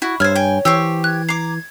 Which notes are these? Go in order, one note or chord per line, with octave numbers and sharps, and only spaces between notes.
E4 F#4 C#6
G2 C5 C#5 E5 F6 G#6
G5 G#5
E3 G4 C5 C#6 E6
F#6 G#6
A#5 D6 C7